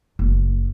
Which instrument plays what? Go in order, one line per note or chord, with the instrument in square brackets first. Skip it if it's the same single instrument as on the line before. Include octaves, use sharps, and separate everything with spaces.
[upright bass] F#1